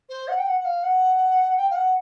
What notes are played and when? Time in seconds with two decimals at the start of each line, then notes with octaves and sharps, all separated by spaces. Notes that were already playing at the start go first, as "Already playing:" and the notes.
0.09 C5
0.28 F#5
0.38 G5
0.46 F#5
0.60 F#5
0.65 F5
0.83 F#5
1.56 G5
1.70 F5
1.75 F#5